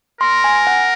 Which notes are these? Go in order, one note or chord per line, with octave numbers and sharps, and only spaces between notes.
A#4 C6
G#5
F#5